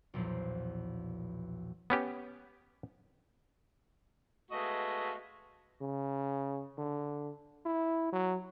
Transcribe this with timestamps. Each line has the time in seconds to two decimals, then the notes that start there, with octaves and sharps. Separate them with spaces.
0.14 B1 E2 A#2 F3 C7
1.90 B3 C#4 G4
4.50 G#3 A3 B3 F#4 D#5 F5
5.81 C#3
6.78 D3
7.65 E4
8.12 F#3